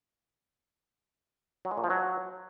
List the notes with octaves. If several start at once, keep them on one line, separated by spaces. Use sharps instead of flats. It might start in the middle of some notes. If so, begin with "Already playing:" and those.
F#3
G#3
A#2
F3
F#3